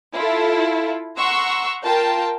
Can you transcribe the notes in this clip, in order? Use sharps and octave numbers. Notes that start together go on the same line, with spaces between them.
E4 F4 A4
F#5 A#5 C6 C#6 E6
F4 A#4 G5 A5